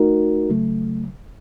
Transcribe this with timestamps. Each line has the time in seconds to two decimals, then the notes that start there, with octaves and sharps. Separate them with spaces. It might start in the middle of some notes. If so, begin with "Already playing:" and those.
Already playing: A3 D#4 F#4 A#4
0.49 C#3 F#3 A3